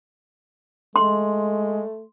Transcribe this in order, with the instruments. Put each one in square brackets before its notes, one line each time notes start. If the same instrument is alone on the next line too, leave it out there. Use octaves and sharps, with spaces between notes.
[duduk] G#3 [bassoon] A3 [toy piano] C6